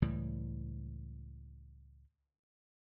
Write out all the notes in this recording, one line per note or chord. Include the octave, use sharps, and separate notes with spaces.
C#2 A2 E3 G3